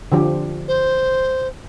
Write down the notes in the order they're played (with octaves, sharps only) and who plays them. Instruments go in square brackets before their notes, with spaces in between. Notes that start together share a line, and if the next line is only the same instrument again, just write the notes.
[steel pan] D3 F3 G4
[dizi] C5